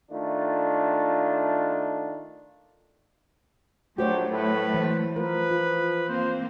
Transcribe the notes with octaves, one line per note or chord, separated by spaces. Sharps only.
D#3 A3 D4 F4
A#1 F#3 A3 F#4 G4 C5 C#5
A2 B4
E3 C5
F3 A#4 B4
F4
A#3 C4 C5